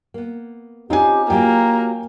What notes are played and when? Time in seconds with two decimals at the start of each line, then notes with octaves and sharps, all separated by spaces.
0.14 A#3 B3
0.90 C4 C#4 D#4 F4 G4 G#5
1.30 F#3 A#3 F4 G4 G5 G#5 A#5